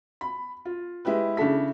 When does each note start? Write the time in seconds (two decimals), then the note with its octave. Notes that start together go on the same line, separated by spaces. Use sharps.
0.21 B5
0.65 F4
1.05 G#3 E4 G4 B4
1.37 C#3 D4 E4 A4 B6